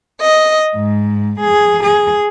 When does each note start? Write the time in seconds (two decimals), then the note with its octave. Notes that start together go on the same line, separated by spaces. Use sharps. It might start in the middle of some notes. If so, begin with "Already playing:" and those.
0.21 D#5
0.76 G#2
1.40 G#4
1.83 G#4